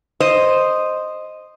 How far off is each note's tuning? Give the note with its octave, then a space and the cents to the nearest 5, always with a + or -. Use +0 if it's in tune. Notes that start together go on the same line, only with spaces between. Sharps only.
C5 +0 D#5 -5